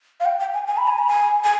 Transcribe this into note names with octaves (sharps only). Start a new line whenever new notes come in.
F5
G5
G5
G#5
G#5
B5
G#5
B5
G#5
G#5